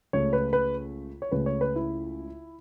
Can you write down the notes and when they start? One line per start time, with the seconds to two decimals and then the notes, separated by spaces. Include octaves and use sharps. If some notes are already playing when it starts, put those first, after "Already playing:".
0.13 C#2 C#3 A3 C#5
0.33 B4
0.53 B4
1.22 C#5
1.32 C#2 C#3 A3 B4
1.46 C#5
1.61 B4
1.76 E4